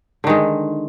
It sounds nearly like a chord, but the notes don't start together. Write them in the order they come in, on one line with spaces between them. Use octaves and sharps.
D3 D#3 G#3